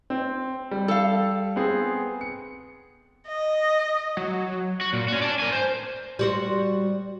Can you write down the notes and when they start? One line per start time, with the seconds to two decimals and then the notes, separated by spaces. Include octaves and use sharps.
0.10 C4
0.71 G3
0.88 A4 F5
1.56 B3 C4 G#4
2.21 C#7
3.28 D#5
4.17 F#3
4.81 F#4
4.93 A#2
5.08 C#4 F#4
5.22 D5 A5
5.40 A#4 G#5
5.52 C5
6.19 G3 F#4 C5